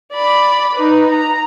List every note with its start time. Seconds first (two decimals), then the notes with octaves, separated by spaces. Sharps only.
0.12 D5 B5
0.74 D#4 B4
1.10 A#5